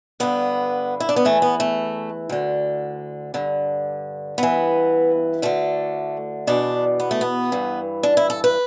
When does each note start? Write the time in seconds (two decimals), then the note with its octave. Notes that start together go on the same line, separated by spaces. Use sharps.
0.20 G2 D3 B3
1.00 E4
1.09 D4
1.16 B3
1.25 E2 E3 A3
1.42 B3
1.60 A3
2.29 D2 D3
3.34 G2 D3
4.38 G2 E3 B3
5.42 D2 D3 A3
6.47 E2 B2 D4
7.00 B3
7.11 A3
7.21 B3
7.52 G2 E3
8.03 D4
8.17 E4
8.30 A4
8.44 B4